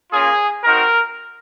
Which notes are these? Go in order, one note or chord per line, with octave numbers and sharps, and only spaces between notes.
A#3 C#4 F4 G#4
C4 D#4 F#4 A#4